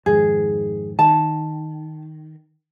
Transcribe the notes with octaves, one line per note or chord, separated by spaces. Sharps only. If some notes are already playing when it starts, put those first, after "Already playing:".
F2 G#2 D#3 G#4
D#3 A5